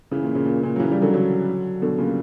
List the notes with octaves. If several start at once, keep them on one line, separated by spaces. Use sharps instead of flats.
C#3 E3
A#2
A#2 C#3
A#2
A#2 C#3
F#3
C#3 E3
E3 G3
D3 F#3
D3 F#3
B2 D3
A#2 C#3